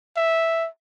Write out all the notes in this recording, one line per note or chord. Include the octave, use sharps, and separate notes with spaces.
E5